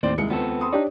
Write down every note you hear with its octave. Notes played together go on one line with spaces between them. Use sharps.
D#2 A2 C4 C5 D5
C2 G#3 C#7
C#2 B3 C4 A4
B5 C6 D#6
D4 D#4 G4 C#5 D5